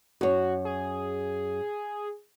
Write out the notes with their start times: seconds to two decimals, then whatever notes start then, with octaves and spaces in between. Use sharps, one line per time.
0.21 F#2 F#4 C#5
0.65 G#4